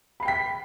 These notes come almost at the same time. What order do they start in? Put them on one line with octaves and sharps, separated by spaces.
B5 C7 G5 B6